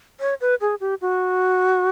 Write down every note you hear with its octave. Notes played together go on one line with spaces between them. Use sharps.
C#5
B4
G#4
G4
F#4